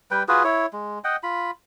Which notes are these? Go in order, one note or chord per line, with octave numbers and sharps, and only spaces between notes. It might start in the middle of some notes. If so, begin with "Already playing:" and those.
G3 B4 G5
F4 F#4 G#4 B4
E4 C#5
G#3
D#5 F#5 G5
F4 B5